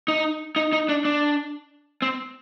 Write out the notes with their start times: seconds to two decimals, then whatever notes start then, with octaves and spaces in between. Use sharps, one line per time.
0.08 D#4
0.56 D#4
0.73 D#4
0.89 D4
1.05 D4
2.02 C4